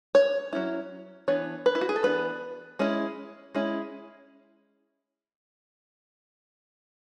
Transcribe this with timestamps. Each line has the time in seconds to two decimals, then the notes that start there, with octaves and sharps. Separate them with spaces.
0.15 C#5
0.53 F#3 C#4 E4
1.28 E3 B3 D4 C#5
1.66 B4
1.75 E4
1.81 F#4
1.89 G#4
1.96 A4
2.03 E3 B3 D4 B4
2.79 G#3 C#4 E4
3.55 G#3 C#4 E4